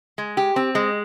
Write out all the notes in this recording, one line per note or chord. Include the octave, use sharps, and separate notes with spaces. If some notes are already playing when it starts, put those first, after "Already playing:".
G#3
G4
C4
G#3